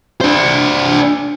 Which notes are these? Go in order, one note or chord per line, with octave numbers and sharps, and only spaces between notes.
D4 C5